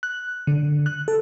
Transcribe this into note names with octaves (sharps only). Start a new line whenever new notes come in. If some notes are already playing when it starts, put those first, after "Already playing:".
F#6
D3
F#6
A4